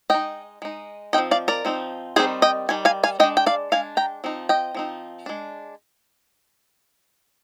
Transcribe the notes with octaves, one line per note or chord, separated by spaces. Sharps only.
G#3 D#4 D#5 G5
G#3 D#4
F3 C4 D#4 D#5 G5
D5 F5
A#4 D5
F3 C4 D#4
D#3 G3 C4 D#4 G#4 C5
D#5 G5
D#3 G3 G#5
F5 G#5
F5 G#5
G#3 D4 D#5 G5
G5
D5 F5
G#3 D4 F5 G#5
G5 A#5
F3 C4 D#4
D#5 G5
F3 C4 D#4
G#3 D4